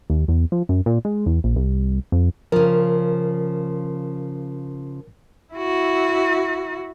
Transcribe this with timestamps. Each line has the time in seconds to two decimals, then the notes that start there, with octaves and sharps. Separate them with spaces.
0.10 D#2
0.28 E2
0.52 F3
0.69 F#2
0.86 A#2
1.05 G#3
1.26 E2
1.44 A#1
1.56 C2
2.12 F2
2.52 C#3 F3 A#4
5.54 E4 F#4